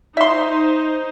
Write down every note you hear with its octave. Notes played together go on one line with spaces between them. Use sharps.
D#4 C5 E5 C6